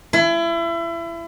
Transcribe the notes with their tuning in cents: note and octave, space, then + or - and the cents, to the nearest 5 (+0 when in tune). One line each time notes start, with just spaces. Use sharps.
E4 +30